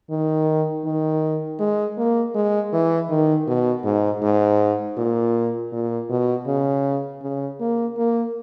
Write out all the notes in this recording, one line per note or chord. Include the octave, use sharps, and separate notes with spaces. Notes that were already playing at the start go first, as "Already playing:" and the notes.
D#3
D#3
G#3
A#3
G#3
E3
D#3
B2
G#2
G#2
A#2
A#2
B2
C#3
C#3
A#3
A#3